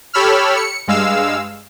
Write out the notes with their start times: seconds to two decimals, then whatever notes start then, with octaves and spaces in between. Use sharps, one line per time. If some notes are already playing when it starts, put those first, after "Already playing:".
0.13 G4 A4 C#5 B5 E6 F6
0.56 C#7
0.87 G2 G#3 F5 E6